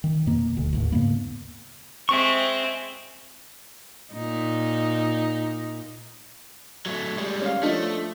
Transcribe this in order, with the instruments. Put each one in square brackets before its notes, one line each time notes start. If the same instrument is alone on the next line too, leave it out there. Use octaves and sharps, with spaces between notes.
[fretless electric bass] D#3
F2 B2 A#3
D#1 D2
A1 D#2 A2
G#2 C#3 A#3 B3
[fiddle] G#3 C4 [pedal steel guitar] E5 C#6
[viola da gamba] A#2 D#4
[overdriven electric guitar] F#3 A3
G3 G#3
[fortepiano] C#4 F5
[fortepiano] F3 D4 D#5 [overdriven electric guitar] A3